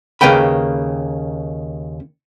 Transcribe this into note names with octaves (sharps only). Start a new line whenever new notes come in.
D#2 C#3 A#3 B4 G5 B5